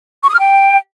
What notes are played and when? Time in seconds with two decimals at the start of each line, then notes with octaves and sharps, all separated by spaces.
0.23 C#6
0.28 D#6
0.34 F6
0.40 G5